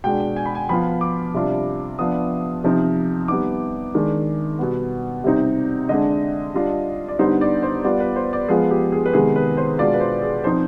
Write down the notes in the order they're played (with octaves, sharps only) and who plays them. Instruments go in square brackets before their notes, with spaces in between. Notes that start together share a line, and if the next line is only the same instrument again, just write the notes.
[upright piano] B2 G#3 D4 G5
G#5
B5
G#5
F3 B3 F4 B5
D6
C3 G3 D4 F4
F3 B3 D4 F4 D#6
C3 F3 C4 D#4
G3 B3 D#4 D6
D#3 G#3 D4
B2 G3 B3
C3 G3 C4 D#4
D3 G#3 D4 D#5
G3 D4 F4
D5
D3 G3 B3 D#4 C5
D5
C5
G3 B3 F4 D5
B4
C5
D5
F3 G#3 B3 F4 G#4
G4
G#4
B4
C3 D#3 G#3 B3 G#4
B4
C5
B2 G#3 D4 F4 D5
B4
C5
G#4
F3 C4 D#4 C5